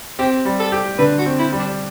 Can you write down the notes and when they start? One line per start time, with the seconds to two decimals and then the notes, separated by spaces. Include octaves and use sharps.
0.19 C4 G4
0.45 G3
0.59 A4
0.72 G4
0.98 D3 B4
1.19 F#4
1.26 C4
1.39 E4
1.52 G3
1.59 D4